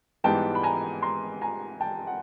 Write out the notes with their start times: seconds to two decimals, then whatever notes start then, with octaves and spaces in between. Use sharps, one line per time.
0.24 G#2 E3 G3 B3 D#4 G5 A5
0.55 B5
0.63 G#5 A#5
1.02 A#5 C6
1.42 G#5 A#5
1.81 G5 A5
2.07 F#5